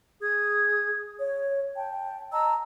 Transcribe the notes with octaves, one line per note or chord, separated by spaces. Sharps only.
G#4 D#6 G#6
C#5
G5 A5
D#5 A5 A#5 E6